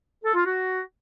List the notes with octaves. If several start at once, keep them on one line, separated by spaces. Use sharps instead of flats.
A4
F4
F#4